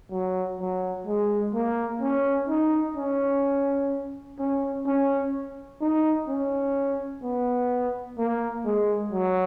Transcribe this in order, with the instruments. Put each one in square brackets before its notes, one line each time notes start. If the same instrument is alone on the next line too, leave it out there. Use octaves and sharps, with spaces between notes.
[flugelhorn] F#3
F#3
G#3
A#3
C#4
D#4
C#4
C#4
C#4
D#4
C#4
B3
A#3
G#3
F#3